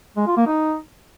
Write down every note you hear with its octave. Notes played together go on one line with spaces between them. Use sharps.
G#3
F4
A#3
D#4